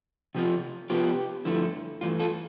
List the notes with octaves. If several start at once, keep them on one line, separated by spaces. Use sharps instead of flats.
C3 F3 C4 F4
C3 F3 B3 F4 G4
G2 D3 F3 A3 E4
G2 E3 A3 F4
F4 A4